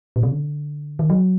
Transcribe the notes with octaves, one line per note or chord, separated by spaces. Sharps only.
A#2
C3
D3
D#3
F#3